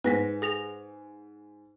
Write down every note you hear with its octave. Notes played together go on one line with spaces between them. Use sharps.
G#2 B4 A#6 B6
G#4 A#6 F7